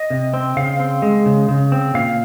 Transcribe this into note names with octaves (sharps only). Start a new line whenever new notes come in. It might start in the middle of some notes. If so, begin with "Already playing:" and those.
Already playing: D#5
C3
C4
C#3 F5
C4
G#3
C#3
C#3
C4
A#2 F5